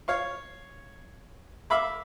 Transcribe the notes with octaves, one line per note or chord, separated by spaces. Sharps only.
C#5 F5 C#6
E5 F5 B5 D6